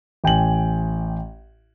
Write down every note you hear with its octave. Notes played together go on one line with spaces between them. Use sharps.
A1 G5 G#5 F#7